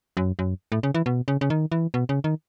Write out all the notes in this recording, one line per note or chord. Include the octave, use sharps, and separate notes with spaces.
F#2
F#2
A2
C#3
E3
B2
C#3
C#3
D#3
E3
B2
C#3
D#3